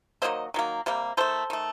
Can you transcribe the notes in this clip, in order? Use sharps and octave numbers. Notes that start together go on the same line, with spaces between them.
D#3 F#3 A#3 C5 D#5
D#3 F#3 A#3
C3 G3 A#3
D#3 A3 A4 C5
D#3 A3